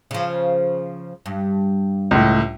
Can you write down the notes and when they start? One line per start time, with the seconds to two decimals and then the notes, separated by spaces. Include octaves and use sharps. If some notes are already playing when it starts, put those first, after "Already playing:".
0.11 C#3 F3
1.26 G2
2.11 C#2 A2